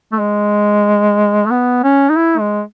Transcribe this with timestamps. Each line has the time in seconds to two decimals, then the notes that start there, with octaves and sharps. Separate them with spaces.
0.12 A3
0.20 G#3
1.46 A3
1.51 B3
1.83 C#4
2.10 D#4
2.16 E4
2.39 G#3